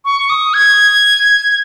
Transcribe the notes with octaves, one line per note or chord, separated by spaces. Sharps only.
C#6
D#6
G#6